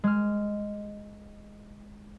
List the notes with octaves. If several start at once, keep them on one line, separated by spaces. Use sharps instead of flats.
G#3 F6